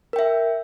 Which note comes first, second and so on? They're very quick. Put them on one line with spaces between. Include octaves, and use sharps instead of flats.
A#4 G5 E5